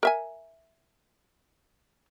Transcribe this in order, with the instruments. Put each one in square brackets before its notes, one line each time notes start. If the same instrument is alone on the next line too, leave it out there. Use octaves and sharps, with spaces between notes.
[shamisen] A#4 E5 G#5